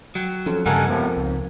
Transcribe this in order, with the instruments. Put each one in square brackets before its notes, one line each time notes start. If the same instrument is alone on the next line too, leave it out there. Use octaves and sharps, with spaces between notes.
[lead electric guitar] F#3 [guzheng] G5
[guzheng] F2 [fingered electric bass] C#4
[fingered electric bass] G2 C#3 [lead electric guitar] G3 G#3 [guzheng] A#3 [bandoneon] A4 F#5 G#5
[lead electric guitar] F2 [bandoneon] A2 C3 F3 [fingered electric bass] G#3 B3
[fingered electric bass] C#2 [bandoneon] G#2